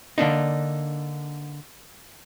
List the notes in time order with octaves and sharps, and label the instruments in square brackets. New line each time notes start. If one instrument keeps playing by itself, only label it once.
[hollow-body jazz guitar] D3 A#3 D4 D#4